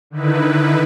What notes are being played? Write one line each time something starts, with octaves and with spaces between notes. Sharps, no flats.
D3 D#3 D#4 E4 B4